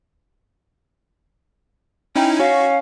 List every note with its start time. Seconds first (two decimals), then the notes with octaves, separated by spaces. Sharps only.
2.16 C#4 D#4 E4 G5
2.40 C#4 F#4 F5